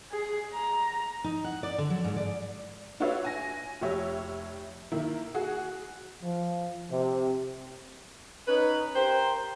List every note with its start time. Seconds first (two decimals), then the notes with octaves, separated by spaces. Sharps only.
0.11 G#4
0.53 A#5
1.24 D#4
1.44 F#5
1.63 D5
1.78 D3
1.90 F#3
2.04 G#2
2.16 D5
3.00 D4 F4 F#4 B4 C#5 E5
3.25 G#5 A#6
3.81 F1 G4 C#5 E5
4.92 D#3 A#3 E4
5.34 F#4 G#4
6.24 F3
6.91 C3
8.47 C#4 D#4 B4
8.95 G4 A#4 C5